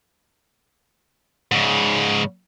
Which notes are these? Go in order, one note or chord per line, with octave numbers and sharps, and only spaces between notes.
G#2 C#3